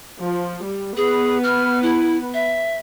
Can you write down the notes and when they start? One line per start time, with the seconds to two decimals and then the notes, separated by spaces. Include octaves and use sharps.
0.23 F3
0.66 G3
0.97 B3 G#4 B4
1.43 F6
1.82 E4
2.34 E5